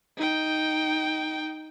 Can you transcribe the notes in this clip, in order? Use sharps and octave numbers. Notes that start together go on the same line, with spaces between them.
D#4 G5